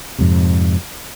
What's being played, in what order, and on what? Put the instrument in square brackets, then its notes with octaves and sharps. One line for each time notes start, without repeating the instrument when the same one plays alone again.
[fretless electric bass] F2 G#2 C3